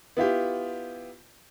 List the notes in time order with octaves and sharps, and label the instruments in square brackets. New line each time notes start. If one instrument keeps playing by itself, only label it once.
[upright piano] B3 E4 F4 G4